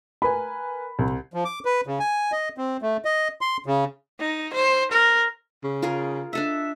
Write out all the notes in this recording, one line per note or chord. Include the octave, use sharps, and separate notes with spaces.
A#4 B4 G#5 B5
C2
F3
D6
B4
C#3
G#5
D#5
C4
A3
D#5
C6
C#3
D#4
C5
A#4
C#3
F4 G#4 A#4
D4 A4 D#5 E5